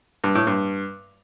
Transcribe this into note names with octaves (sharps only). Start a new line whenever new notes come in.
G2
A2
G2